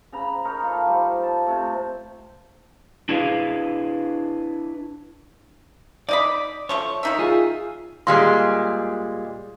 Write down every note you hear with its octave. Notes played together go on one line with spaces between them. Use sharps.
C#3 A#5 B5
D#4 A#4 C#5
F4 A4
G3 C5
A5
C3 A3
D4 E4 G#4 B4 F5
D#4 D5 D#5 B5
F3 A3 C#5 C#6
D#3 D#4 E5
F4 G#4
A#2 G3 G#3 C6